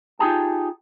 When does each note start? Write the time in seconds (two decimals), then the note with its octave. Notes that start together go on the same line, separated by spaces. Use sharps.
0.19 D#4 F4 G4 G#4 A5